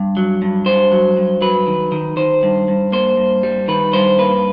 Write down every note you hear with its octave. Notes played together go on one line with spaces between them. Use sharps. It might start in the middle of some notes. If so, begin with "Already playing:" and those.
Already playing: G2
F#3
G2
G2 C5
F#3
G2
F#3 B4
D#3
D#3
D#3 C5
G2
G2
A#3 C5
G2
G3
D#3 B4
G2 C5
A#3 B4